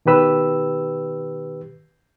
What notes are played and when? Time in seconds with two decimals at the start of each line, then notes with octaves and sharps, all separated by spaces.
0.06 B2 D#3 G4 B4 E6